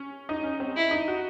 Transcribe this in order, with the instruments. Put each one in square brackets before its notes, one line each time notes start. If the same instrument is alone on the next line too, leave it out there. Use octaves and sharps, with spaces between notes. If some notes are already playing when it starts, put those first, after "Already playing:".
Already playing: [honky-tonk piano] C#4
D#4
C#4
C4
[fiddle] E4
[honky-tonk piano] D#4
F#4